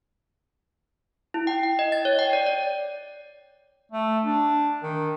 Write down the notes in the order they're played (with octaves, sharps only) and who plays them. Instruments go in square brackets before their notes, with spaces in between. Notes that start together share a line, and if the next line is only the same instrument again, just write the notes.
[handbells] E4
G5
G5
D#5
A6
C#5
G5
D5
D5
[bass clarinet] A3
D4
D#3